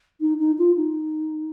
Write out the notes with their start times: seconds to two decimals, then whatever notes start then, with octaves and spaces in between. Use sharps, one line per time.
0.21 D#4
0.39 D#4
0.58 F4
0.76 D#4